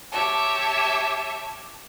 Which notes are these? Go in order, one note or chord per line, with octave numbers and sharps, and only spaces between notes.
G4 C#5 E5 A5